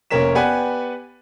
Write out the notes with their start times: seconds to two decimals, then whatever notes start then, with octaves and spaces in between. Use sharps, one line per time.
0.10 F1 A#3 C#4 A#4 B6 E7
0.35 B3 G4 B4 D5 F#5 G#5